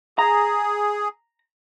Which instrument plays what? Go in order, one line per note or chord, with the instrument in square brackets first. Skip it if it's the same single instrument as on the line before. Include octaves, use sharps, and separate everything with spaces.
[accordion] G#4 [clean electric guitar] A#5